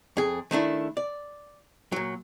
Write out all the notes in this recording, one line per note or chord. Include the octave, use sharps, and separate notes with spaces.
F2 G#4
D#3 A3 D4 E4
D5
A#2 F#3